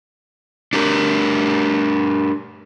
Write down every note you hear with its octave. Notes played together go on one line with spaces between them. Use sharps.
D4 G4 A#4